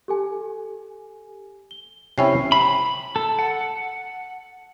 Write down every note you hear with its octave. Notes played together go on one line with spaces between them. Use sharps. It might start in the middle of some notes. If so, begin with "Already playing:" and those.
G4 A4 G#5
G7
C3 C#4 E4 G5 C7
B5
A4
F#5